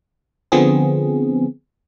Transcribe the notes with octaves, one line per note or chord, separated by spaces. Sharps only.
D3 F3 B3 C4 G#4